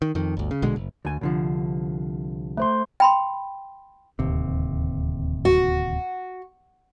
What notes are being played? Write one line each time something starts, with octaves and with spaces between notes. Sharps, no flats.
D#3
F2 D#3
G1 D2
C#3
A#1 B2 D3 G#3
F#1
D2 G#5
C2 D3 F3
A3 C5 C6
G5 B5 C6
D1 D#2 C3
F#4